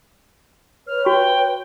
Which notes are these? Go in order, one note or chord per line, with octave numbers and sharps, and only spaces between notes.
B4 C#5 F6
F#4 G5 C#6